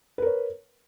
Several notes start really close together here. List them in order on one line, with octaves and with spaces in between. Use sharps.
B4 A#4 C#5